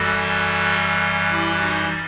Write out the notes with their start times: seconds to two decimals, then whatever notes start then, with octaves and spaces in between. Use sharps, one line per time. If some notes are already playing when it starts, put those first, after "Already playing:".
Already playing: F#2 E3 G3 F#4 A4
1.30 E4 G4
1.60 D#4 F#4